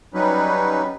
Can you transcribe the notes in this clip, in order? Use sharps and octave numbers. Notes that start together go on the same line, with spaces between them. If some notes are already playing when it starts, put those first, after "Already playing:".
F#3 G3 C#4 D#4 B4